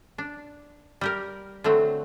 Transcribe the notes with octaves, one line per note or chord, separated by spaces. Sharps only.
D4
G3 G4 A#4
D3 F#3 A3 C4